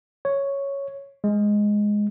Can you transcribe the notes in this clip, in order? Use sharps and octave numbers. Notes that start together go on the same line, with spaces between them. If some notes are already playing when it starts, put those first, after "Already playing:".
C#5
G#3